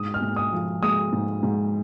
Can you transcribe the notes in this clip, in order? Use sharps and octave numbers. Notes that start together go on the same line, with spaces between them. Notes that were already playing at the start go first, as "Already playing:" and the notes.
Already playing: G#2 D#6
F6
G#2
D#6
F3
G#3 D#6
G#2
G#2